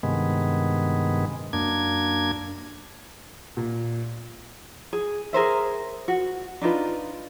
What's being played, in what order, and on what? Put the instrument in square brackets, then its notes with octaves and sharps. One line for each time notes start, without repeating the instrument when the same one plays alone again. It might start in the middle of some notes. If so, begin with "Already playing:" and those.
[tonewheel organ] G2 C3 D#3 G#3 B3
F#2 A#3 D4 G#6
[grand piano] A#2
[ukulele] G#4
G#4 A#4 C5 E5
F#4
D4 D#4 F4 B4